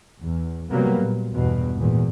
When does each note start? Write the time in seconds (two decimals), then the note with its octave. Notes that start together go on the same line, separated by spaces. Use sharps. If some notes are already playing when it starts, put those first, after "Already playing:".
0.21 E2
0.70 C3 F#3 G3 A#3 B3
1.01 A#2
1.35 E2 G2 B2
1.77 G#1 E2 A#2